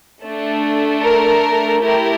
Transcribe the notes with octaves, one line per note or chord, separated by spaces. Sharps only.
A3 D4 A4
A#4
A3 E4 G4 A#4